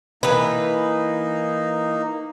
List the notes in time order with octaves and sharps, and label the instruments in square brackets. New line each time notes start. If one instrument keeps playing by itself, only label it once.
[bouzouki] E3 B4 [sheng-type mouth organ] A#3 D#4